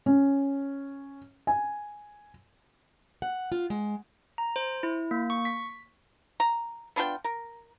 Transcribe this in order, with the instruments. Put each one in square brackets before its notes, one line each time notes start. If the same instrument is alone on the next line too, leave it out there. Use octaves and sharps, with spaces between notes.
[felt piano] C#4
G#5
[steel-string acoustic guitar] F#5
F4
G#3
[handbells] A#5
C5
E4
A#3
C#6
B6
[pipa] A#5
B3 D4 F4 G5
A#4